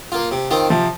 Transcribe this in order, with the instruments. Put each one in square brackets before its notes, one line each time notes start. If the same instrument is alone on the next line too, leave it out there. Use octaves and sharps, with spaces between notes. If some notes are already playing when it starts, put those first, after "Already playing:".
[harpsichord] A#3 F4
C3
D#3 C4 F4
[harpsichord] C3 [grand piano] F3